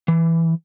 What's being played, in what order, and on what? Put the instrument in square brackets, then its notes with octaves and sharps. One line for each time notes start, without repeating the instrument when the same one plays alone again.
[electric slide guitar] E3